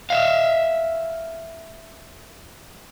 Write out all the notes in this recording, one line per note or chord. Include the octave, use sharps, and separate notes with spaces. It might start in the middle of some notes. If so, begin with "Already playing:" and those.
E5 F5